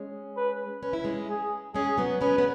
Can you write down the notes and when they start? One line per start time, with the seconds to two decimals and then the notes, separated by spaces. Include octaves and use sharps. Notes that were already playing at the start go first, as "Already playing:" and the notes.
Already playing: G#3 C#4
0.37 B4
0.82 C#4 B4
0.93 E4
1.04 G#3 C#4
1.29 G#4
1.74 G#3 C#4 G#4
1.98 F#3 B3
2.21 G#3 C#4 B4
2.38 B3